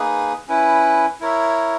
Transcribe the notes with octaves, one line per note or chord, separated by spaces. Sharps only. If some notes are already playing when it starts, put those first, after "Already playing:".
Already playing: A#3 D#4 G#4 B4
C#4 E4 B4
E4 A#4 C#5 E5